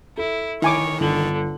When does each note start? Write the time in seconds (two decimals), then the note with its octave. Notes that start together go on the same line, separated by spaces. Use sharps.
0.18 E4 A4
0.62 D#3 E4 C#5 G#5 D6
1.01 G1 D3 F#7